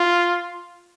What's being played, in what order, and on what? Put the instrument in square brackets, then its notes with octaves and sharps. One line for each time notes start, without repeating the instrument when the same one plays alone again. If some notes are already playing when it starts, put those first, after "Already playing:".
Already playing: [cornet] F4